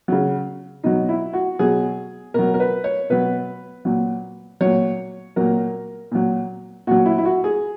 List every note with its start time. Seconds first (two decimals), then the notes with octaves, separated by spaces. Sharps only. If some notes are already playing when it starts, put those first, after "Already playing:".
0.08 C#3 F#3
0.83 B2 F#3 D#4
1.09 E4
1.33 F#4
1.59 B2 F#3 G#4
2.34 B2 F#3 A#4
2.54 A#4
2.60 B4
2.84 C#5
3.10 B2 F#3 B4
3.85 A#2 F#3
4.61 A#2 F#3 C#5
5.36 A#2 F#3 A#4
6.12 A#2 F#3
6.87 A#2 F#3 F#4
7.06 E4
7.18 E4
7.25 F#4
7.44 G#4